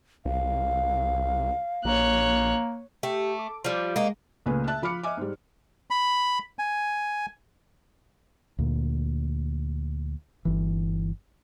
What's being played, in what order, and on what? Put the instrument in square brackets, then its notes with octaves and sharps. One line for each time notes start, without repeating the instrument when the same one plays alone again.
[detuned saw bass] C2 [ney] F5
[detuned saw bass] A#1 [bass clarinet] A#3 [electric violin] C#5 F#6
[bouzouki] A3 [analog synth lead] G4
[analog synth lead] D6
[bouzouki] F3 G3 [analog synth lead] D6
[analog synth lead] G#3 [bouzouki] A#3 D#4
[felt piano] C#2 A#2 C#3 A3 B4 G#5
E5 A5 F#6
F3 B5 D6 F6 C#7
D#5 E5 G#5 D6
G#2 G3
[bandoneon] B5
G#5
[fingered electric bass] D2 A#2
G1 E3